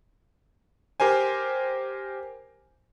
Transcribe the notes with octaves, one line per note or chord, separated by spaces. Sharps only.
G4 A#4 C5 G#5